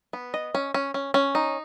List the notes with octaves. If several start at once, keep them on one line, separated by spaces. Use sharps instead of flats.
B3
D#5
C#4
C#4
C#4
C#4
D#4